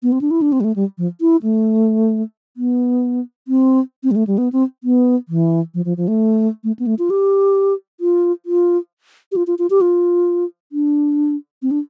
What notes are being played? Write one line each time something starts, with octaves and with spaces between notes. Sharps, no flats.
B3
C4
D4
E4
D4
C4
G3
A3
G3
F3
E4
A3
B3
C4
C4
G3
A3
G3
B3
C4
B3
E3
F3
F3
F3
A3
A3
B3
A3
F4
G4
F4
F4
G4
F4
F4
F4
G4
F4
D4
C4
D4